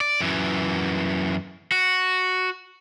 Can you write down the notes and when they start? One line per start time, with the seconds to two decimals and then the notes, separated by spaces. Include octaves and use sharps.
0.01 D5
0.21 F#2 E3
1.72 F#4